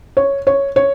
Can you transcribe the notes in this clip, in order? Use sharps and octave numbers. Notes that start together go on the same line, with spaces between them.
C#5
C#5
C#5